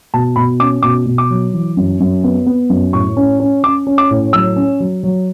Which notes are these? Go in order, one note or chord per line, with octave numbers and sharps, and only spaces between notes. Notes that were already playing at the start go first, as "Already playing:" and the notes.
B2 A5
B2 B5
C#4 D6
B2 D6
B2
D6
F#3
E3
F#2
F#2
B3
B3
F#2
A2 C#6
C#4
C#4
C#4 D6
C#4
D6
A2
F#3 E6
C#4
F#3
F#3